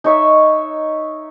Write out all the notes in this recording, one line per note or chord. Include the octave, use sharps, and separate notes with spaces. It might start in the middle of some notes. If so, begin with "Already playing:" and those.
D#4 C#5 E5